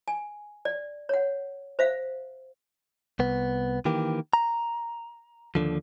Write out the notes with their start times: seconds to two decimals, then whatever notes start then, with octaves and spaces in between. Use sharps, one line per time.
0.08 G#5
0.65 D5
1.09 C#5 F#5
1.79 C5 E5 F5
3.19 C2 B3
3.85 D#3 E3 A#3 G4
4.33 A#5
5.55 D#2 A#2 D3 F3